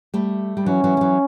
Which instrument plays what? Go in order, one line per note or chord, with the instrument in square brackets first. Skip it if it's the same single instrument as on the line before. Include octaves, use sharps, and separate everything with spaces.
[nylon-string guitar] G3 A3
G3
[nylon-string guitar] E3 F#3 [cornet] C#4
[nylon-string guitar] E3 F#3
F3
E3 F#3